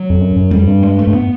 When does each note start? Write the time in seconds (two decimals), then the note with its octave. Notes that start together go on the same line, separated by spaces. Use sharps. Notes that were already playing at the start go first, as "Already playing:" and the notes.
Already playing: F#3
0.10 F2
0.21 F#2
0.36 F#2
0.51 F2 G3
0.67 G2
0.83 G#3
0.99 A3
1.07 G2
1.14 B3